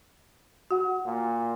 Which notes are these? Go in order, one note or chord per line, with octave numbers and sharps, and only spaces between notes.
F#4 F#5
A#2